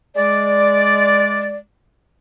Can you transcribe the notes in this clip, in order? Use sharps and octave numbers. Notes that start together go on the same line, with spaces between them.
G#3 D5